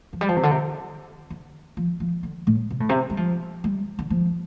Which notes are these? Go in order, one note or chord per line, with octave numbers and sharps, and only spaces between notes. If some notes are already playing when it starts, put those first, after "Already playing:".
F3
G3
F3
C3
D3
C3
D3
F3
F3
D3
A2
C3
A2
C3
G3
F3
G3
D3
F3